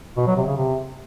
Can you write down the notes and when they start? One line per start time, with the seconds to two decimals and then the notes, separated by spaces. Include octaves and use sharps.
0.17 B2
0.27 F#3
0.37 C3
0.47 C#3
0.57 C3